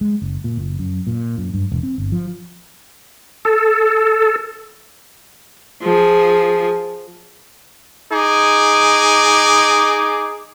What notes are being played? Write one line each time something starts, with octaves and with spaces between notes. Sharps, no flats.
G#3
F#1
A#2
F#1
F#2
A#2
F#2
G2
E1
C4
G1
F3
A4
F3 G#4
D#4 G#4 D6